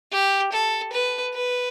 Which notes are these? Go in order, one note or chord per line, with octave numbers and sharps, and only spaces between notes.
G4
A4
B4
B4